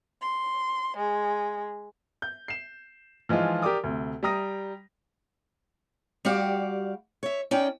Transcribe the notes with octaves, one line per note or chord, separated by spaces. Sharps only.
C6
G#3
G6
C7 E7
E3 F3 G#3 D#4 F4
G4 A#4 D5 D6 D#6
D2 C3
G3 G5 A#5 D#6 A#6
G3 F#4 G4 D5 F5 F#5
C#5 E5
C#4 D#4 D5 G5